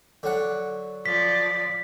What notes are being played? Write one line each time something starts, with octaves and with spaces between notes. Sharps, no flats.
D3 F#3 F#5
F3 D5 B6